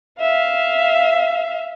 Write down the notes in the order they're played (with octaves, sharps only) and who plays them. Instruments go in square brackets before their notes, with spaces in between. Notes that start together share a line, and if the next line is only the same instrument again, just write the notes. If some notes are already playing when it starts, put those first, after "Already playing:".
[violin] E5 F5